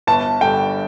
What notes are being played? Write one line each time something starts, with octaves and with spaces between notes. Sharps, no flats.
G1 A5
G2 D3 G5